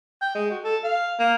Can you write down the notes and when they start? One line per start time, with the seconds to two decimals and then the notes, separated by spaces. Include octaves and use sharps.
0.22 G5
0.35 G#3
0.51 F#4
0.64 A4
0.84 F5
1.19 A#3